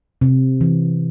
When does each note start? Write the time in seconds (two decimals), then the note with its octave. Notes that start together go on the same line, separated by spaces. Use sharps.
0.21 C3
0.61 E3